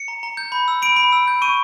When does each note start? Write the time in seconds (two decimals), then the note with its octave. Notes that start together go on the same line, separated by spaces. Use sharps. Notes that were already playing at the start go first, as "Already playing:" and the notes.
Already playing: C#7
0.08 A#5
0.23 A#5
0.37 G6
0.52 B5
0.68 E6
0.82 B5 D7
0.97 B5
1.12 E6
1.27 G6
1.42 C#6 D#7